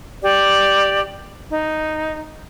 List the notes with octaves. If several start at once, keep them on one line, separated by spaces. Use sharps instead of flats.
G4 D5
D#4